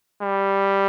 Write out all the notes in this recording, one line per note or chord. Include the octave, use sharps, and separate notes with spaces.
G3